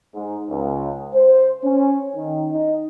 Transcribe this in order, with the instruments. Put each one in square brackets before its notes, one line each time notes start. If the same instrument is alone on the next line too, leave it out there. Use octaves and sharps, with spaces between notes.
[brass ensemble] G#2
C#2
C5
C#4
D#3
D#4